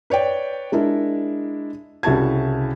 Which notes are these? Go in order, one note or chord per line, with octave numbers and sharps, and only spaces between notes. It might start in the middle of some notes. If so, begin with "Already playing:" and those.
B4 C#5 D5 G5
G#3 D4 E4 A#4
C2 C#3 E4 F#4 A5 G#6